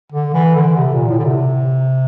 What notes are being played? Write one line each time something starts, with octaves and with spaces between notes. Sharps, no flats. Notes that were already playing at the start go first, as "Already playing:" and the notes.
D3
E3
D3
C3
A#2
A2
D3
C3